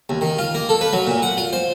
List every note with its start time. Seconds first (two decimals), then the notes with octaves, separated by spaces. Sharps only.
0.09 D#2
0.21 D#3
0.39 F4
0.54 A#3
0.69 A4
0.81 B4
0.93 F#3
1.07 A#2
1.22 F#5
1.37 F4
1.53 C5